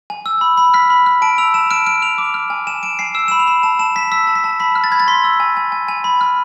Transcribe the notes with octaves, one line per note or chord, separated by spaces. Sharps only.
G#5
E6
B5
B5
F6 B6
B5
F6
A5 D7
E6 F7
A5 E7
F6 D7
F6 D7
F6 F7
D6
F6
G#5
G#5 E7
G#5 D7
G#5 C7
E6 E7
B5 E7
F7
B5
A5 E7
A5 E7
A5 B6
E6 B6
A5
B6
A5
B5 B6
F6
A6
B5 G#6
A6
C6 B6
E6
G#5
G#5
G#5
G#5
B5
F6